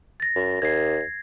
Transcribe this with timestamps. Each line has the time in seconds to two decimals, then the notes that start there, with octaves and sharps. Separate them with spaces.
0.20 A6 A#6
0.36 F#2
0.62 D#2 G#6 C7